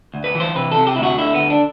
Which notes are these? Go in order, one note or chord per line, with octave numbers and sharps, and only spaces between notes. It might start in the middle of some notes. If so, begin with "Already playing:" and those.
D2
B4
E3
C5
C3 B4
C3 A4
G4
D2 E4
F#4
D3 E4
B3
D2
D4